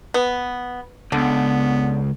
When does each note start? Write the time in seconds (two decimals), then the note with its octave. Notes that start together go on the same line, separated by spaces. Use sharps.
0.14 B3
1.12 C#2 D3 B3